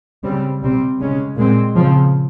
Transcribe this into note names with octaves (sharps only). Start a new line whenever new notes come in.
C#3 G3 C4
C3 G3 C4
C#3 G#3 C#4
A#2 G#3 C4
C#3 F3 C4